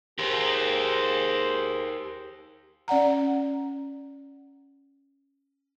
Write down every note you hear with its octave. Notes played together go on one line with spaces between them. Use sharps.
G4 G#4 A#4 C5
C#4 D5 F#5 A#5